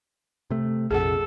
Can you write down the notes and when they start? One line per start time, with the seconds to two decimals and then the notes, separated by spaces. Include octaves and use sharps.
0.50 C3 A3
0.91 A#1 F2 C3 G#4 A4 F#5